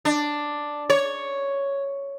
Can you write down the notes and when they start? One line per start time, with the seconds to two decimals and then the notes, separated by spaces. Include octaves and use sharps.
0.05 D4
0.90 C#5